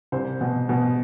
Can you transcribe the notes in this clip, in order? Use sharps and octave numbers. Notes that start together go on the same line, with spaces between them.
C2 C5
B2
B2